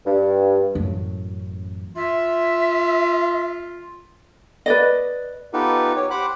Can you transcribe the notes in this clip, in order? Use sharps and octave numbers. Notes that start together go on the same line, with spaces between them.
G2
A1 F#2
F4 E5
B4 D5 D#5
B3 D#4 F4 G4 A4 B4
G4 C#5
G4 C5 F#5 B5 D6 F#6